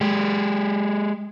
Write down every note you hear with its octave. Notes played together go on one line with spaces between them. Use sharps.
G#3 G4